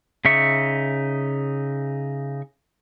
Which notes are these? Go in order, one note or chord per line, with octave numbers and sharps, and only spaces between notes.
C#3 D#4 E5 C#6